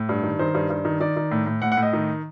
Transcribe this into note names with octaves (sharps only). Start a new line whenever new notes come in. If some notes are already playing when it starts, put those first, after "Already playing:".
Already playing: A2
G2
D#3
D#3 C5
G2
G2
D#3
D#3 D5
D#3
A2
A2
A2 F#5
F#5
A2
D#5
D#3